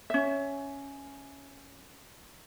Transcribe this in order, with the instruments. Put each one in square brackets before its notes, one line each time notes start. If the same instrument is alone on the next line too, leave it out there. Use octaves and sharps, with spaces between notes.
[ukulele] C#4 E5